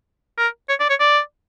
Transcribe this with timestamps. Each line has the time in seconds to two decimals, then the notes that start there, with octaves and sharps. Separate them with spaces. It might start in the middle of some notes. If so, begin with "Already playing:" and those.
0.38 A#4
0.69 C#5
0.80 D5
0.90 C#5
1.00 D5